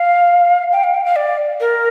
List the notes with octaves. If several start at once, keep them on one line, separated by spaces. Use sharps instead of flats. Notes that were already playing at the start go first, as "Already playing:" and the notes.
Already playing: F5
G5
F5
G5
F5
D5
A#4